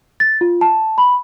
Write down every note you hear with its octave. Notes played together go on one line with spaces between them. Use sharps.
A6
F4
A5
B5